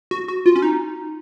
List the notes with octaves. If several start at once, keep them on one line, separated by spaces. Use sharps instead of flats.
F#4
F#4
F4
C#4
D#4